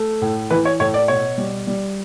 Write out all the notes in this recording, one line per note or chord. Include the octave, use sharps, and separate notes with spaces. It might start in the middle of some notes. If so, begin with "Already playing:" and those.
Already playing: A3
A2
E3 B4
C#5
A2 C#5
D5
B2 C#5
G3
G3